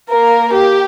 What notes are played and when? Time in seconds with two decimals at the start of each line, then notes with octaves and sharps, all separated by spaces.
0.11 A#3 A#4
0.54 G4